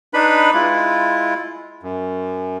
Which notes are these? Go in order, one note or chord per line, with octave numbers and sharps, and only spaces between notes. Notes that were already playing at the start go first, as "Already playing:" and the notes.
D4 D#4 B4 B5
G#3 E4 F4
F#2